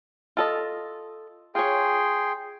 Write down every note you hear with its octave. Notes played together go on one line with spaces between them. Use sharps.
F4 A4 D#5
F4 G#4 C#5 G5 C6